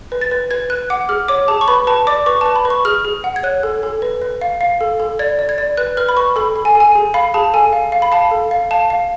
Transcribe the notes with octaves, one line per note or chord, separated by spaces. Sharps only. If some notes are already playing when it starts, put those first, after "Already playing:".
B4
A6
B4
B4 G#6
B4 F#6
F#5 D6
G#4 F6
C#5 D6
G#4 A5
C#6
B4 B5
B4 A5
D5 D6
B4 C#6
A5
B4
B5
B4
C#6
G#4 F6
G#4
F#5
G#6
C#5 F#6
A4
A4
B4
B4
F5
F5
A4
A4
D5 G#6
D5
G#6
D5
B4 F#6
B4 F6
B5
B4 C#6
A4 B5
A4
G#5
A4
G#5
G#4
F5 B5
G#4 A5
A4 G#5
F5
F5
B5
F5 A5
A4
F5
F5 A5
F5